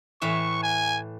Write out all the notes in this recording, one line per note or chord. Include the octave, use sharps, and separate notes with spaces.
A2 E3 E5 C#6
G#5